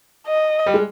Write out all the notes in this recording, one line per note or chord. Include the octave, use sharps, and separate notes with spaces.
D#5
G3
G#3